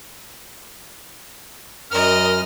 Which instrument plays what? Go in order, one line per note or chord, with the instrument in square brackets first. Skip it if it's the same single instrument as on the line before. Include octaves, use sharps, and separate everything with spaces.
[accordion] F#2 F6 [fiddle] A#4 D#5